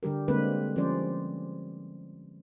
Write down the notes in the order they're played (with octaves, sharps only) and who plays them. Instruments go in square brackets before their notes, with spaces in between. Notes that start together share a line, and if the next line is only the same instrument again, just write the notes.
[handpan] D3 G3 G4 A#4
D3 G3 G#3 A#3 C4 B4
F3 G3 C#4 C5 D5